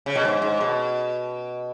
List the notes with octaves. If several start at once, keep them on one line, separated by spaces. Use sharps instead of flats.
C#3
B2
G#2
G#2
B2